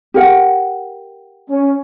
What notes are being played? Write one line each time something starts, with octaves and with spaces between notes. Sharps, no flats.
G4 A#4 F#5
C#4